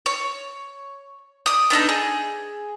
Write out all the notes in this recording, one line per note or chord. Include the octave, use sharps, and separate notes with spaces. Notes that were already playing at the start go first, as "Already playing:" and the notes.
C#5
D5 D#6
B3 D4 D#4 A4
G#4